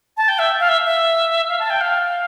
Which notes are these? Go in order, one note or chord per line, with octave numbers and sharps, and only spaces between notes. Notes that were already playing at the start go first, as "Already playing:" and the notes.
A5
G5
E5
F5
E5
E5
F5
A5
G5
F5